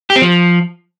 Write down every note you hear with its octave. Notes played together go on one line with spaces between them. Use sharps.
G4
C4
F3